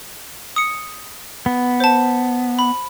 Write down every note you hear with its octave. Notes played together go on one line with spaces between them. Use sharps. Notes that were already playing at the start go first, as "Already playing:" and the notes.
D#6 C#7
B3
C5 A5
B5